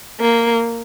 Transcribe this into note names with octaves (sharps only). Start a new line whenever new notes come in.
A#3